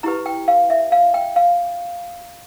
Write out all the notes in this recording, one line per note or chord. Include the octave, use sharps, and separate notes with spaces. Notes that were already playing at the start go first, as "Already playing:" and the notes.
E4 G4 B4 A#5
G5
F5
E5
F5
G5
F5